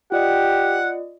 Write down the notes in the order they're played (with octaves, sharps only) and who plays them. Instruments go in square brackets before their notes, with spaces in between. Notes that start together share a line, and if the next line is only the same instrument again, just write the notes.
[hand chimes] F4 D5 D#5 [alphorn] G4 [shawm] F#5